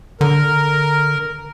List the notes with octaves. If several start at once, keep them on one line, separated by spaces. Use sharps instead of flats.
D3 A#4